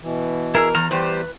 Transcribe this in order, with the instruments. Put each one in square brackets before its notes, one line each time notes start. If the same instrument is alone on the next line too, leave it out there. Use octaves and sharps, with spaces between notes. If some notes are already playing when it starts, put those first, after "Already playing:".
[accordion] B2 E3
[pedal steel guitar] E4 G#4 E6 [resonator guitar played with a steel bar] A#4
[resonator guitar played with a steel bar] E2 [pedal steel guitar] A#5 F6
[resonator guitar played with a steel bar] E2 [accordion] G3 G4 C5 [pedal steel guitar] B4